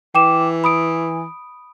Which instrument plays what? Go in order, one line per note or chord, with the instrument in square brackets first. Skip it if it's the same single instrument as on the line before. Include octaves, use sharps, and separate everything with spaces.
[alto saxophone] E3 [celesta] G5 D6 E7
[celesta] B5 D#6 D7